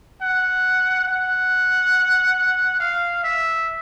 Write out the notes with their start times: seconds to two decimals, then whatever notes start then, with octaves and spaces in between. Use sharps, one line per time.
0.22 F#5
1.08 F#5
2.80 F5
3.24 E5